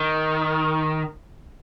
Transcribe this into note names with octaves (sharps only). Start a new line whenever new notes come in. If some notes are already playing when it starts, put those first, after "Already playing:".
Already playing: D#3